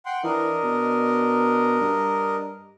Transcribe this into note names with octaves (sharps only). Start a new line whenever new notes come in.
F#5 G5 C6
E3 D4 A#4 D#5
B2
G2